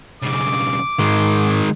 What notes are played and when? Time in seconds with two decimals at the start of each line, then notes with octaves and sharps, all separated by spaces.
0.22 B1 C#3 D6
0.99 G#2 D#3 G#3